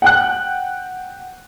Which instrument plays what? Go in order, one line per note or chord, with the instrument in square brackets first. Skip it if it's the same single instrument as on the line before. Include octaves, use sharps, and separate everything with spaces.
[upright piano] F#5 G5 F#6